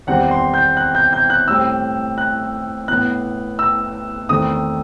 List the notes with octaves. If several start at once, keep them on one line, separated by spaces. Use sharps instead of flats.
E2 D#3 G3 C4 F#5
C6
G6
F#6
G6
G6
F#6
A2 G3 C4 E6
F#6
A2 E3 B3 F#6
E6
E2 D#3 A3 C4 D#6